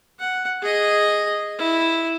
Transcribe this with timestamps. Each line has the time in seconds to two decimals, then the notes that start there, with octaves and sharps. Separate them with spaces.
0.19 F#5
0.62 G#4 D#5
1.58 E4